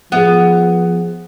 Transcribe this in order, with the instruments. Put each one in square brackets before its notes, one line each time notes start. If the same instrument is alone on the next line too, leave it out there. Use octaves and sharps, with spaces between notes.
[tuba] F3 [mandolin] B3 [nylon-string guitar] G#4 E5